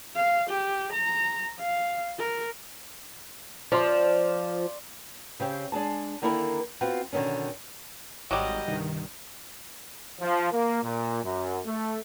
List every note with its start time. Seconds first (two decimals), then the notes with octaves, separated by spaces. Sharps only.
0.16 F5
0.50 G4
0.93 A#5
1.60 F5
2.20 A#4
3.72 F3 D5 C6
5.40 C#3 C4 G4
5.72 G#3 D4 G#4 A5
6.22 D3 D#3 A#3 E4 A4 A#4
6.81 B3 C4 F4 F#4
7.13 B2 D3 D#3 A3 C#4
8.31 G#1 F#3 G3 D#5 D6
8.67 C2 G2 D#3
10.20 F3
10.52 A#3
10.83 A#2
11.23 F#2
11.65 A3